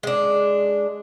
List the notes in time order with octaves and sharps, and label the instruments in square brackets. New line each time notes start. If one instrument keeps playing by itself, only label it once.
[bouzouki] G#3 D4